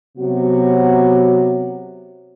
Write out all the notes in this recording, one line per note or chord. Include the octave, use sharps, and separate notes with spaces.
C3 F#3 B3 F#4